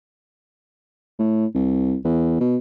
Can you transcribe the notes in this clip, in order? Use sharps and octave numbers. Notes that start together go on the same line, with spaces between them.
A2
C2
E2
B2